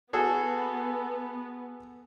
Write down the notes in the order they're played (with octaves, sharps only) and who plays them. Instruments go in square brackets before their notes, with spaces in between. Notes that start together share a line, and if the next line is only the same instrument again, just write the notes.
[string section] B3 [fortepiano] F#4 G#4 A4